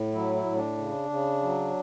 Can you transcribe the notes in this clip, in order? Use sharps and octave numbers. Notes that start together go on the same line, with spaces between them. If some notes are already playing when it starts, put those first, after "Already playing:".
Already playing: A2
F#3 E4
E4
A2
D4
C#3
C#3
F#3